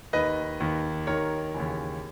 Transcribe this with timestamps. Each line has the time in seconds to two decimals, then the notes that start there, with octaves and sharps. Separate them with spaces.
0.13 D#2 D#3 B4 D#5
0.60 D#2 D#3
1.07 D#2 D#3 A#4 C#5
1.54 D#2 C#3 E3